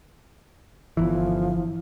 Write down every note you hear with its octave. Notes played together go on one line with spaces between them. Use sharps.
G1 E3 F3